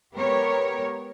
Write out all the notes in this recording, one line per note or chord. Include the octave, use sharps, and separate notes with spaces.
G#3 B3 G4 A#4 C#5